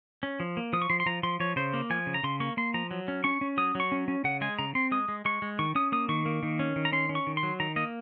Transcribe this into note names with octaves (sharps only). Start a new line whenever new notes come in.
C#4
F3
A#3
F3 D#6
C#6
F3 C6
C6
F3 A#5
F3 C6
F3 C#5
C#3 C5
A#3
F3 G#5
C#3
A#5
C#3 C6
A#3 C#6
A#3 C6
F3 A#5
F#3
C#4
C#4 C#6
C#4
F#3 D#6
F#3 C#6
C#4
C#4
C#3 F#5
G#3 G#5
C#3 A#5
C4 C6
G#3 D#6
G#3
G#3 C#6
G#3
D#3 C#6
C#4 D#6
A#3 D#6
D#3 C#6
A#3
D#3
C#4
D#3
A#5
C#4 C6
C#4
C#6
D#3
C6
F#3
D#3 A#5
A#3 D#5